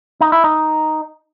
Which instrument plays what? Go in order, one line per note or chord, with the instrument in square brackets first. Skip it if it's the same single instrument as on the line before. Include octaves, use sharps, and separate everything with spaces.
[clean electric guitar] D#4
E4
D#4